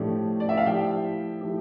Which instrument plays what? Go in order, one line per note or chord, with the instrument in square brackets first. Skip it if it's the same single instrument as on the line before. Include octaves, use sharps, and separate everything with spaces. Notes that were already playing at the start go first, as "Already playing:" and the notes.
Already playing: [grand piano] A2 F3 A3 D4 G4
[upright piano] D5
E5
F5
[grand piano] F3 A3 E4 G4 [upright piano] E5 G5
[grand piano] F3 A3 E4 G4